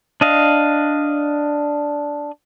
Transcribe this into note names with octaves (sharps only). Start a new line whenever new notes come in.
D4 D#5 F5